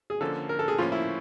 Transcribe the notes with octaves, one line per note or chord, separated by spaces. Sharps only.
G#4
D3 F3 A#3 C#4 A4
A#4
A4
G#4
A2 F3 A#3 C#4 F4
E4